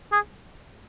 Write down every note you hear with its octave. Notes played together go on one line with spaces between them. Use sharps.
G#4